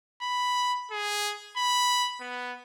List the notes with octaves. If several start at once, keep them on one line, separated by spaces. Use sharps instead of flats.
B5
G#4
B5
B3